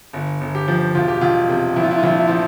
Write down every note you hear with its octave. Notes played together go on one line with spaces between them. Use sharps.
G1
G1
G4
F3
E1 F4
G4
E1 F4
C3
A#1 E4
F4
E4
F4
A#1 E4
F4
E4
F3 F4